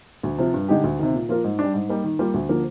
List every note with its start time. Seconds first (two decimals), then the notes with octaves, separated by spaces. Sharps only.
0.23 D2
0.38 C3 F3
0.54 G2
0.69 D3 G#3 D#4 G4
0.84 D2
0.99 C3 D#3
1.14 A#2
1.29 F3 A#3 F4 A#4
1.44 G#2
1.59 D4
1.64 G3
1.74 G#2
1.89 G3 A#3 D#4
2.04 D#3
2.19 G3 A#3 F4
2.34 D2
2.49 D3 F3 A#3